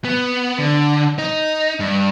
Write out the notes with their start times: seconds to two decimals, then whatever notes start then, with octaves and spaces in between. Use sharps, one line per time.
0.05 B3
0.59 D3
1.19 D#4
1.80 G2